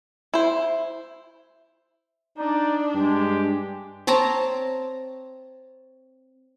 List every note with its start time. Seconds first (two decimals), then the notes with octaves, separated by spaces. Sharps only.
0.34 E4 C5
2.38 D4 D#4 D5
2.94 G2 G#3 G4
4.07 C4 C#5 A5 A#5